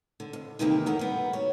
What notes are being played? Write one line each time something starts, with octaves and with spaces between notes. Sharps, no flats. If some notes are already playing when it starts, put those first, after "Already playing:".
D3
F2
D#2 C3 D#3 E3 A#3 G4
E2 D3 A#4
G3 B3
F#4 C#5